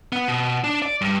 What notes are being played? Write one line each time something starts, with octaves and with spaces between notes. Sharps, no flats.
B3
B2
D4
D5
G2